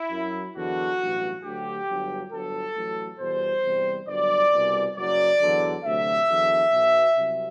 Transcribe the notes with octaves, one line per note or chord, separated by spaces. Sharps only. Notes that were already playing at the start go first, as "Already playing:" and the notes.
Already playing: E4
F#2 F#3
E2 D3 F#3 F#4
A1 G2 F#3
D2 D3 F#3 G4
G1 G2 F#3
G1 G2 F#3 A4
A1 A2 F#3
E2 B2 G3 C5
E2 C3 G3
G1 G2 F#3 D5
C2 B2 G3
F#1 F#2 F#3 D5
E2 D3 F#3
D2 C3 F#3 E5
E2 D3 F#3
B1 B2 F#3
C2 C3 F#3